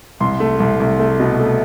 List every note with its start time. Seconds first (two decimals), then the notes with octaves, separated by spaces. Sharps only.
0.20 C2 C6
0.40 A3
0.60 C2
0.80 C2
1.00 A3
1.20 B2
1.40 A3